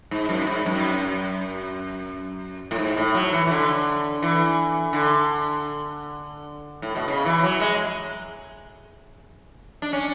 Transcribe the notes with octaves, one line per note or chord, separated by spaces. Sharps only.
G#2
F#2
G#2
F#2
A2
G#2
A2
F#3
E3
E3
D3
E3
D3
A2
B2
C#3
E3
F#3
G#3
D4
C#4